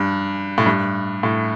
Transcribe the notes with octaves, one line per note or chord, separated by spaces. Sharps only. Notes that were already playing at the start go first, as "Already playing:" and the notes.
Already playing: G2
A2
G2
A2